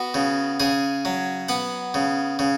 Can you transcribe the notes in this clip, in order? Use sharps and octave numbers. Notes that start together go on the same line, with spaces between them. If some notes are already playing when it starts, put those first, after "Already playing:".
Already playing: B3 F#4
C#3
C#3 G#4
F#3
B3 F#5
C#3
C#3